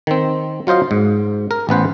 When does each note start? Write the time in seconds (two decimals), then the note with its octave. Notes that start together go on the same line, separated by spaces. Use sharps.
0.07 D#3 C4
0.67 F#3 F4 C5 D#5 F5
0.91 G#2
1.51 A#4
1.69 A1 B3 B4 C5